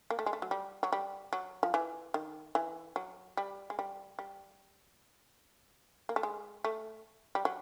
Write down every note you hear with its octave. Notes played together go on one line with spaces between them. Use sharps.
A#3
A3
G#3
A3
F#3
G3
F#3
G3
F#3
F3
E3
D#3
E3
F#3
G3
G#3
G3
G3
A#3
A3
G#3
A3
G3
F#3